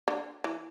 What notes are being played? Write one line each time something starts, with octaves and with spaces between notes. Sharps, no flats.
D3
E3